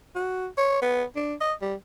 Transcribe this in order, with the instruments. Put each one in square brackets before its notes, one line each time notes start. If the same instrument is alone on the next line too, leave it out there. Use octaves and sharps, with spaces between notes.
[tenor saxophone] F#4
C#5
B3
D4
D#5
G3